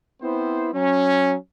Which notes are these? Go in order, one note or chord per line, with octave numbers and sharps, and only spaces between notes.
B3 C4 E4 C5
F#3 C#4